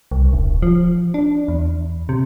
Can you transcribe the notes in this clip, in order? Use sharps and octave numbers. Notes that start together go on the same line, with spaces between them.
C2
D#1
F3
D4
E2
C3